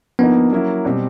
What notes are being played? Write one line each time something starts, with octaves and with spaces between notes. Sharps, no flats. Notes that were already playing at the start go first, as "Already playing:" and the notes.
D3 F3 A#3 B3 D#4
F#3 A#3 C#4 E4
B2 G3 C4